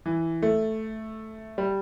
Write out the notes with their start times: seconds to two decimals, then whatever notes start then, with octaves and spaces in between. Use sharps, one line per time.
0.06 E3
0.42 A3
1.58 G3